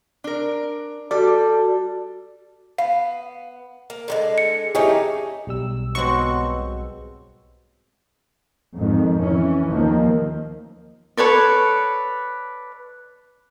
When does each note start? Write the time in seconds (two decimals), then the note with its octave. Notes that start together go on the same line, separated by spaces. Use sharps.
0.24 D4 A#4
1.11 G3 F#4 A4 D5
2.78 B3 F5
3.90 A#3
4.08 D3 G3 G#3
4.38 C#7
4.75 A3 C#4 D#4 G4 G#4
5.47 B1 G3 E6
5.95 G#2 B2 F#3 C4 C#6
8.76 F2 G#2 D#3
9.21 E3 C#4
9.69 D#2 D#3 F3 A#3
11.17 A4 B4 C#5 D5